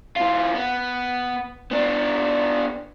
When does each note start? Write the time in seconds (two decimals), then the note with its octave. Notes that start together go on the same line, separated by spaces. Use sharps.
0.16 E3 F4
0.55 B3
1.71 B3 D4